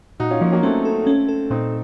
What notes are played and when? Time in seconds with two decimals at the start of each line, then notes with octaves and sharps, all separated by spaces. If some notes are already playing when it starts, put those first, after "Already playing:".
0.20 A#2 D#4 F#4
0.31 C#4 F4
0.41 F3 A#3 C#4
0.52 F#3 A#3
0.63 A3 C4 C#4
0.85 A4
1.07 C#4
1.28 A4
1.50 A#2 C4 D#4